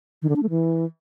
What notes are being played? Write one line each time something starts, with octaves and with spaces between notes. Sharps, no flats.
D#3
D3
D4
A3
E3